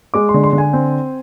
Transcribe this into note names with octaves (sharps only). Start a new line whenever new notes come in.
G#3 D6
C6
D3
C6
D3
G#5
C4